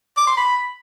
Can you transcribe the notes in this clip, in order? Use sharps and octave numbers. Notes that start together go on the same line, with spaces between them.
D6
C6
B5